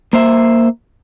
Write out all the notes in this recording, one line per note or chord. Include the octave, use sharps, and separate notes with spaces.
A#3 C5 E5